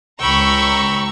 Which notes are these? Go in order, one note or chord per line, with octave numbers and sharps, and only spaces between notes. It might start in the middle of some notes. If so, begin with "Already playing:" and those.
C#2 G5 A#5 B5 C#6 E6